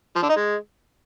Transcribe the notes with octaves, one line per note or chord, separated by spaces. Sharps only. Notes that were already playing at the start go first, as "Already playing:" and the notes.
F3
D3
D#4
G#3